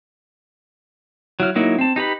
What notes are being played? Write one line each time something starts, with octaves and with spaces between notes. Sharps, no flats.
F#3 E4 F6
F#3 A#3 D#4 E4
C4 A5
D#4 G4 B4 B5